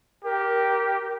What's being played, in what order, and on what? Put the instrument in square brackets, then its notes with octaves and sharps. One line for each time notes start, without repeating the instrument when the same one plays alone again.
[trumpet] G4 [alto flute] A#4